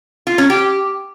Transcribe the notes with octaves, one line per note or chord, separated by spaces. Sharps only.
F4
C#4
G4